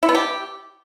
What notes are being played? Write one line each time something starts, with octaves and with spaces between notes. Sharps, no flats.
E4
B3
G4